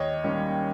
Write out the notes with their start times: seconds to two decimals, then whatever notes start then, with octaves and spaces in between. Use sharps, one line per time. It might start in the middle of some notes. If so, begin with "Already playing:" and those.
Already playing: D#2 C#5 D#5
0.24 D#3 G3 A#3 C#4